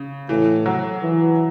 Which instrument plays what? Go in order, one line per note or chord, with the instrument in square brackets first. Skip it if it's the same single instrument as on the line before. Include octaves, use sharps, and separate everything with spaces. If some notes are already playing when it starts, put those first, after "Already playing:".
Already playing: [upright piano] C#3
[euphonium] A2 [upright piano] E3
[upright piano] F#3
[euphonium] E3